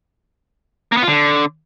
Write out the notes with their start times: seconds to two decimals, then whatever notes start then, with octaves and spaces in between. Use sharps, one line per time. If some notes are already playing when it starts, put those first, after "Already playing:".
0.92 A#3
0.97 B3
1.02 F4
1.08 D3